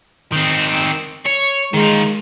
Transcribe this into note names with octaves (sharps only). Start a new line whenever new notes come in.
D#3 C4
C#5
D#3 G#3 F4